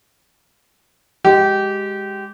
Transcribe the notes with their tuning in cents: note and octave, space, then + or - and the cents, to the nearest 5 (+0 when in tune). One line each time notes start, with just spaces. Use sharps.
G#3 -10 G4 -20